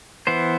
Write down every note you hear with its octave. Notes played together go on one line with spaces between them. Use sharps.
E3 B3 C5